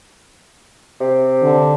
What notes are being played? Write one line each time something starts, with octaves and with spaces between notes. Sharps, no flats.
C3
D3